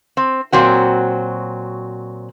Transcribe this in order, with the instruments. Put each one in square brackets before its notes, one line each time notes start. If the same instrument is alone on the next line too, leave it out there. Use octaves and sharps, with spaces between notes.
[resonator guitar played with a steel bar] C4
A#2 F#3 C4 F#4